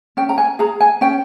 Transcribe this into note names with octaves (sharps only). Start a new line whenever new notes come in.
C#4 G5
A#5
G#5
G#4 A#5
G#5
C#4 G5